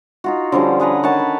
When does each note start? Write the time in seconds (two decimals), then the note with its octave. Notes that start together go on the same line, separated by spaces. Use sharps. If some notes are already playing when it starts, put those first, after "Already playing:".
0.24 D#4 F4 F#4
0.52 D3 F3 G3 C#4
0.80 G#4 B4 F#5 A#5
1.03 D#3 C#5 F#5 A5
1.19 B4